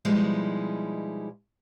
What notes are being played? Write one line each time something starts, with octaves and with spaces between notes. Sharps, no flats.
B2 F3 G3 G#3 D#4 E4